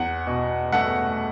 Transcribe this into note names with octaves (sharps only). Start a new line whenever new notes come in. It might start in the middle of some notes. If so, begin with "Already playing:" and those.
Already playing: E2 F#5
B2
A3 F#5